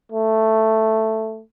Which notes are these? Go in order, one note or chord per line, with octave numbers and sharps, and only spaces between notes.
A3